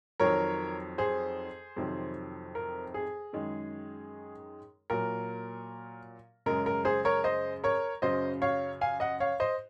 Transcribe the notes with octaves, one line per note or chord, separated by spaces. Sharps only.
F2 D#3 F#3 A#4 C#5
G#4 C5
F2 C3 D#3 F#3
A#4
G#4
F#2 D#3 G#3
A#2 F#3 A#4
F#2 C#3 G#3 A#4
A#4
G#4 C5
A#4 C#5
C5 D#5
A#4 C#5
F#2 C#3 F#3 C5 D#5
C#5 F5
F5 G#5
D#5 F#5
C#5 F5
C5 D#5